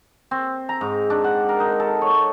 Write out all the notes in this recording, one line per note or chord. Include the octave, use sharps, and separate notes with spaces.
C4
A#5
G#2
D4
F#5
A#4
D#4
A4
C#5